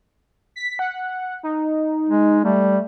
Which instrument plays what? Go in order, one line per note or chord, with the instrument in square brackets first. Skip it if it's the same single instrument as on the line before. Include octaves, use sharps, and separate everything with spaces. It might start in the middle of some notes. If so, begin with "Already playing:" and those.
[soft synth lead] B6
F#5
D#4
[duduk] G#3
[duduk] G3 [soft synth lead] A3